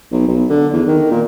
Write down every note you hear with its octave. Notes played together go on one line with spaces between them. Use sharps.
B1
B1
D3
E2
D#3
A#2